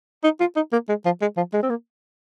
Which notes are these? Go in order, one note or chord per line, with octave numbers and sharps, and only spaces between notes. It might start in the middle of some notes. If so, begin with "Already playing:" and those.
D#4
F4
D#4
A#3
G#3
F3
G#3
F3
G#3
C4
A#3